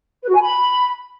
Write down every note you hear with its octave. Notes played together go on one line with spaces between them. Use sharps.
B4
F#4
G#5
B5